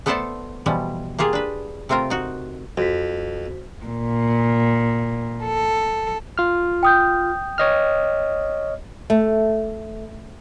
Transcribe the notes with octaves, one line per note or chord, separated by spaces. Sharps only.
A3 B3 A4 C5 D5 A5
B2 E3 F3 G3
A#3 F4 G4 G#4
D4 B4
C3 A3 C4 F4 A#4
D#4 F#4
F2 F#4 C5 B6
A#2
A4
F4 F6
G5 D#6 G6
C#5 D#5 F6
A3